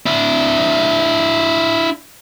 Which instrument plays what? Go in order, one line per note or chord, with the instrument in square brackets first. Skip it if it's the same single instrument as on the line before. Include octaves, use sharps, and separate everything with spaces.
[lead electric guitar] D4 E4